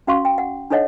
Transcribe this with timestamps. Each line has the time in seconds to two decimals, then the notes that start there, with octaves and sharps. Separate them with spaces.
0.07 C#4 F#4 F5 C6 C#6
0.25 G5
0.38 F#5
0.70 D4 D#4 A4 C#5 D#5 F#5